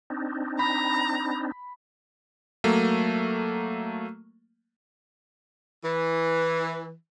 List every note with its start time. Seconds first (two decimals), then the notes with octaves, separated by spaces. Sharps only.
0.10 C4 D4 D#4
0.59 A#5 B5
2.64 F#3 A3 A#3
5.83 E3